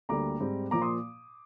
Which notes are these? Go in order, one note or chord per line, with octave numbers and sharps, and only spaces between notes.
D2 D3 G3 A#3 A#5 D6
G#2 G3 C4
A#2 F3 A#3 A#5 D6
C6 D#6